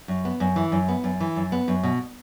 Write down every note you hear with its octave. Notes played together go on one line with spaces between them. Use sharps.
F#2
B3
F#2
E3
F#2
B3
F#2
E3
F#2
B3
F#2
B2